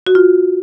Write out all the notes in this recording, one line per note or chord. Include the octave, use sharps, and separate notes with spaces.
F#4
F4